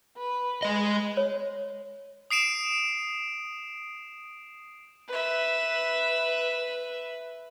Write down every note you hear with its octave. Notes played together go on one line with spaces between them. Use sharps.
B4
G#3 B4 D#5
C#5
D#6 C7 D7 E7
B4 E5